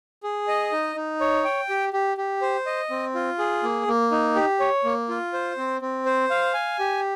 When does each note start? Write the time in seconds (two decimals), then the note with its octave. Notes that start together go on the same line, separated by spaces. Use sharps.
0.23 G#4
0.48 D#5
0.72 D#4
0.96 D#4
1.20 C#5
1.45 G5
1.69 G4
1.93 G4
2.17 G4
2.42 C5
2.66 D#5
2.90 C4
3.15 F4
3.39 G#4
3.63 A#3
3.87 A#3
4.12 D#4
4.36 G4
4.60 C#5
4.84 A#3
5.09 F4
5.33 C5
5.57 C4
5.81 C4
6.06 C5
6.30 F5
6.54 G#5
6.79 G4